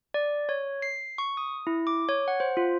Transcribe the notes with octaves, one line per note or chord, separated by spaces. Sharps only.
D5
C#5
C7
C#6
D#6
E4
D6
C#5
F#5
C5
F4